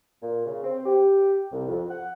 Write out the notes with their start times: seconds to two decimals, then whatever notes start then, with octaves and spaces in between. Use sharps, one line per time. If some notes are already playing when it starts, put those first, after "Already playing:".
0.23 A#2
0.46 C#3
0.63 C4
0.86 G4
1.52 C2
1.68 F2
1.90 F#5